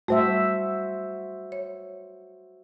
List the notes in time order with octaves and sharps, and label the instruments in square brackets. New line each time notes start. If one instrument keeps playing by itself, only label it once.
[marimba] G3 A3 [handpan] F#4 C5 E5
[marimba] C#5